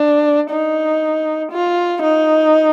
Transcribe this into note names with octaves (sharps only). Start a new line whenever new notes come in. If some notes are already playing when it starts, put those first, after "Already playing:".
Already playing: D4
D#4
F4
D#4